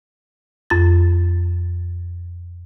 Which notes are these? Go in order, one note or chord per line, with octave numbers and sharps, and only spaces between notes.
F2 A6